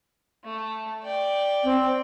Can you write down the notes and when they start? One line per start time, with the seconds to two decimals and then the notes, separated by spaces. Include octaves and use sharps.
0.44 A3
1.03 D5 G5
1.64 C4